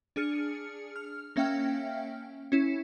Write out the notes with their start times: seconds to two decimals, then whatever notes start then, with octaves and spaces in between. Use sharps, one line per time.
0.16 D4 G#4 F6 C#7
0.96 F6
1.36 A#3 C#4 E5 F5 G5 F6
2.52 C#4 E4